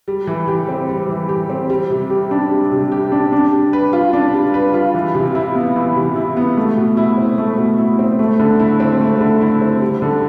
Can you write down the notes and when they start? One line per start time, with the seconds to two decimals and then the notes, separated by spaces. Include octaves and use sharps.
0.08 G3
0.27 E3
0.48 G4
0.69 C4
0.89 G3
1.09 E3
1.29 G4
1.50 C4
1.70 G3
1.90 C3
2.10 G4
2.31 D4
2.51 G3
2.72 C3
2.92 G4
3.12 D4
3.33 D4
3.52 G3
3.73 B4
3.93 F4
4.13 D4
4.34 G3
4.54 B4
4.74 F4
4.94 E3
5.15 C3
5.35 E4
5.55 B3
5.76 E3
5.96 C3
6.16 E4
6.37 B3
6.57 A3
6.77 B2
6.97 E4
7.17 C4
7.38 A3
7.58 B2
7.78 E4
7.99 C4
8.19 A3
8.39 D3
8.60 E4
8.80 C4
9.00 A3
9.21 D3
9.41 E4
9.61 C4
9.81 G3
10.02 D3